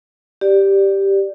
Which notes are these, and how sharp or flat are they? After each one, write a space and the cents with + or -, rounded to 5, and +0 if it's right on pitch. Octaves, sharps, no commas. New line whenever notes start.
G4 +0 D5 +0